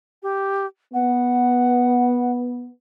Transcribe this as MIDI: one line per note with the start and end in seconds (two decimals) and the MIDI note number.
0.23 0.66 67
0.94 2.70 59
0.94 2.32 78